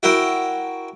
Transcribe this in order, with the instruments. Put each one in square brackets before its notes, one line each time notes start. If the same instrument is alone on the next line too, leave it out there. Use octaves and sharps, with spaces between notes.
[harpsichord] E4 F#4 A#4 E5 G5